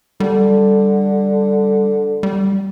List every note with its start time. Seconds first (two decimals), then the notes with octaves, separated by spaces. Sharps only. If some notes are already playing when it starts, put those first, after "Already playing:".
0.20 D3 G3
2.23 G3